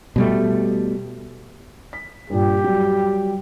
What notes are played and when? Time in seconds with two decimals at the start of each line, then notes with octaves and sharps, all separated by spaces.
0.16 B2 G3 A3
1.93 B6
2.30 G2 A#2 G4
2.63 F#3 G3